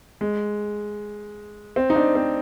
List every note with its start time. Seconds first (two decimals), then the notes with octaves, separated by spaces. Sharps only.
0.21 G#3
1.76 C4
1.90 D#4
1.96 D4
2.15 C4